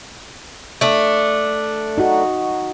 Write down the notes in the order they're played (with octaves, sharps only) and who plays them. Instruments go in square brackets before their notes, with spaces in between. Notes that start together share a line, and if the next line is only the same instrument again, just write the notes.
[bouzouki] A3 D4
[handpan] D#4 F#4